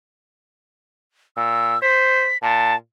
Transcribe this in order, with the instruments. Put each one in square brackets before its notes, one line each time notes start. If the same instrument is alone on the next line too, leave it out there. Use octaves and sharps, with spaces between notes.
[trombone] A#2 [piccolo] E6
[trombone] C5 [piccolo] B6
[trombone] A#2 [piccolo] A5